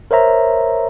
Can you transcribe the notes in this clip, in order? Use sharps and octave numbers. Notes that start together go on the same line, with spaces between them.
A#4 C5 C#5 E5 A#5